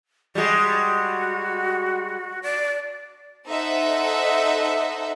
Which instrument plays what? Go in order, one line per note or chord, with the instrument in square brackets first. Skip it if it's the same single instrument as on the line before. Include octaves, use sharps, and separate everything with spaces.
[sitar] G3 G#3 [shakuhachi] F#4
[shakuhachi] D5
[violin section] D#4 A4 C5 D#5 E5 F#5